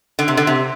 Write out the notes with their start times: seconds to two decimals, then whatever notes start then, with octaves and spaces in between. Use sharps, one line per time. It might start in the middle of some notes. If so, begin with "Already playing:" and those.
0.19 D3
0.28 C3
0.37 D3
0.47 C3